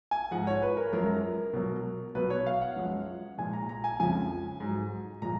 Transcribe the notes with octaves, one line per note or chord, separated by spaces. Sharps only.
G#5
G#2 F3 G#3 F#5
C#5
B4
A#4
F#2 F3 G#3 A#4
B2 F#3
B2 F#3 B4
C#5
F5
F#5
F#2 F3 G#3
A#2 F3 G#3 G#5
A#5
A#5
G#5
F2 C#3 F3 G#3 G#5
G#2 F#3
A#2 F3 G#3 A#5